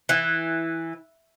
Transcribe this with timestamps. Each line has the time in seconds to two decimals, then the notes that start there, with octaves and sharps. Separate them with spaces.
0.09 E3